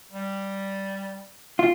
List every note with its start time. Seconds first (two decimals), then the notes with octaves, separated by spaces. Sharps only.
0.12 G3
1.59 F4